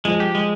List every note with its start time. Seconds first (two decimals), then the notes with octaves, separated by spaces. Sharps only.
0.05 F3 G#3
0.20 G4
0.35 G#3